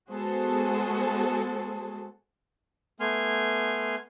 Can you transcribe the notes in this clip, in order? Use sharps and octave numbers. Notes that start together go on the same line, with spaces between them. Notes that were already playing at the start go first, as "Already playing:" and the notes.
G#3 B3 F#4 G#4 A4 C5
A3 B3 G#5 C6 F6